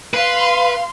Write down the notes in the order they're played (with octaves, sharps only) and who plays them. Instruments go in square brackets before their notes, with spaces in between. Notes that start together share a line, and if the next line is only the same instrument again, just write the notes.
[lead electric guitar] B4 [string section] F5 C6